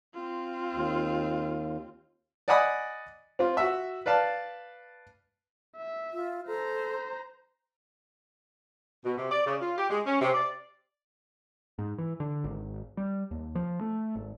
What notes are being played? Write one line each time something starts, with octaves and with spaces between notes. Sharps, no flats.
C4 F4
D#2
D5 D#5 F#5 G#5 B5 D#6
C4 F4
F#4 E5
B4 D5 F5 A5
E5
F4
A4 C5 A#5
B2
C3
D5
C#3
F4
G4
G#3
C#4
C3
D5
G#2
E3
D3
G#1
G3
D#2
F3
A3
G#1